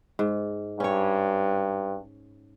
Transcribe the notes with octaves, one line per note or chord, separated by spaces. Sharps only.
G#2
G2 C#4 C#5